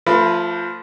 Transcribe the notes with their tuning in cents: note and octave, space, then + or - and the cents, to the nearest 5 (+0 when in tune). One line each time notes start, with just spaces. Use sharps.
F3 +0 A3 +30 B4 +0